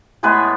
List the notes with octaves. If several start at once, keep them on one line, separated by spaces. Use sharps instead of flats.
A2 G#3 B3 G#4 B4